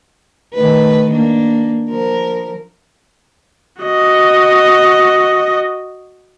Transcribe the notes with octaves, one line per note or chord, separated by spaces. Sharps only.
D#3 A3 B4
A#3 D4
F3 A#4
F#4 D#5